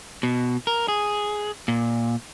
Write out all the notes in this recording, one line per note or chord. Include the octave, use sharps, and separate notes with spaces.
B2
A#4
G#4
A#2